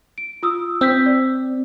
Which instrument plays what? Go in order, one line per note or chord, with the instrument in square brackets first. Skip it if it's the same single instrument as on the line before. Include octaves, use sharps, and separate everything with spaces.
[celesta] D7
F4 D#6 E6
[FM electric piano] C4 [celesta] E6 G6 B6
[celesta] D5